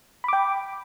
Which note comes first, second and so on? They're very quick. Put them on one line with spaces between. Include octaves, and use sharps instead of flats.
B5 D6 G5